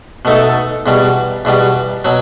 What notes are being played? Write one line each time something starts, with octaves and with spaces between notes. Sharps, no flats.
B2 A3 D#4 A4
E2 B2 G3
E2 B2 G3
B2 F#3